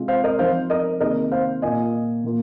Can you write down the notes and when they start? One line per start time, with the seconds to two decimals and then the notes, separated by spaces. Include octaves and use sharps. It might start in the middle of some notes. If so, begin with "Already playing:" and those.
Already playing: C3 G#3 F4
0.08 C5 F5
0.24 A#4 D#5
0.39 F3 C4 D#4 C5 F5
0.70 A#4 D#5
1.00 C3 D#3 A#3 G#4 A#4 D#5
1.32 C5 F5
1.62 A#2 A#3 F4 D#5 G#5
2.24 A#2 A#3 F4